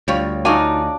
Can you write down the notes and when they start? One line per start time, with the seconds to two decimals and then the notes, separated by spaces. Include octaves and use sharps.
0.08 D2 G3 F4 C#5
0.45 D4 D#4 F4 F#4 D5 G#5